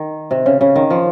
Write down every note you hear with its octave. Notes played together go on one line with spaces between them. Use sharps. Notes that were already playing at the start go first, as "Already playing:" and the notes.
Already playing: D#3
C3
C#3
C#3
D#3
F3